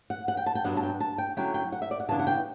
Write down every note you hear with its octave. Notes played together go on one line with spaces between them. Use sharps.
F#5
F#5
G5
A5
G5
G2 F#3 B3 D4 F#5
A5
G5
A5
G5
D3 F#3 C#4 E4 G5
G5
F#5
E5
D5
F#5
C#3 E3 B3 D4 A5
F#5
G5